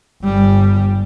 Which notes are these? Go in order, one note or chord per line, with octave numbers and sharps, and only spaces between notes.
G1 G3